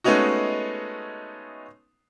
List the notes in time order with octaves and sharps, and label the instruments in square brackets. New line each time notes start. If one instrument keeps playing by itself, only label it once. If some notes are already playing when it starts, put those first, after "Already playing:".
[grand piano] G#3 A3 B3 C#4 D#4 F#4